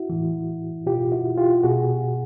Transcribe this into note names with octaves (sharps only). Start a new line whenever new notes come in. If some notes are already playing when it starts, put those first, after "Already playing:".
Already playing: E4 F#4
A2 E3
B2 F4 G4
E4 F#4
F4 G4
B2 F#4 G#4